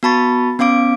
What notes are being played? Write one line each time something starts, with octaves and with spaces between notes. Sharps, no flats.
B3 F#4 A5 B5 C#6 A6
B3 C#4 F5 D6 D7